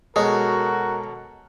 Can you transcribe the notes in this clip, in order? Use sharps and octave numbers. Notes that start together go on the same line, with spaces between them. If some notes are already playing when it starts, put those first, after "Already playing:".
B2 G#3 F#4 A4 A#4 C#5